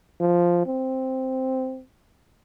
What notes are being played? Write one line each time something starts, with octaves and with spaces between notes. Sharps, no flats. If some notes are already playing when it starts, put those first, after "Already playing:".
F3
C4